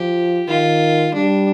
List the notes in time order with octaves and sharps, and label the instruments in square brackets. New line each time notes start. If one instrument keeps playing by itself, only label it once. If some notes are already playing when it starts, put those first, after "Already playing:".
Already playing: [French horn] F3 [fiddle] G4
[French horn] D#3 [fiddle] F4
[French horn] G3 [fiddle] D4